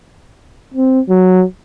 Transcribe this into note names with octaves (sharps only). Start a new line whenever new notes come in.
C4
F#3